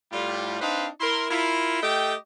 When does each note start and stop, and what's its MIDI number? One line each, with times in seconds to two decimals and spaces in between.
0.12 0.60 45
0.12 0.60 55
0.12 0.60 65
0.61 0.87 60
0.61 0.87 62
0.61 0.87 63
0.61 0.87 71
0.61 0.87 72
0.61 0.87 77
1.00 1.27 64
1.00 1.27 70
1.00 1.27 84
1.30 1.81 64
1.30 1.81 65
1.30 1.81 70
1.82 2.13 57
1.82 2.13 67
1.82 2.13 75
1.82 2.13 79